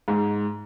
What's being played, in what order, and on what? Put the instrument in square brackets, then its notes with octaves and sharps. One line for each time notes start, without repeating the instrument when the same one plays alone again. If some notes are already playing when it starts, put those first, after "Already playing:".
[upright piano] G#2